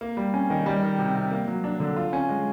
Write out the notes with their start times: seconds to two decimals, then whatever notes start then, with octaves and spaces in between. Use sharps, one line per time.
0.01 A#3
0.17 G3
0.34 C#4
0.50 D#3
0.66 G3
0.83 D#3
0.99 C3
1.15 C3
1.32 A#3
1.48 F#3
1.64 D4
1.80 D3
1.96 F4
2.13 C#4
2.29 G#3